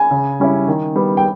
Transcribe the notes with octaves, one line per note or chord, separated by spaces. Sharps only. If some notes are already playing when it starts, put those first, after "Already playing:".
Already playing: G#5
C#3
G3 C#4 E4
D#3
G3 B3
G5